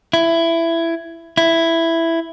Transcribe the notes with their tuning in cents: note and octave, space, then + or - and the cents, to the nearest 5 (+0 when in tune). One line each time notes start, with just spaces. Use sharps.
E4 +15
E4 +5